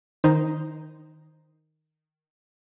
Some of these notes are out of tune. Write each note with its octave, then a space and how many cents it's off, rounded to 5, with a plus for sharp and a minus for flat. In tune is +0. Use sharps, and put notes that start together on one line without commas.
D#3 +0 D#4 +0 C5 +0